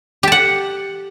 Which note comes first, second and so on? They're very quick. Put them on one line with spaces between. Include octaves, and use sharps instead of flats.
G4 A5 F#5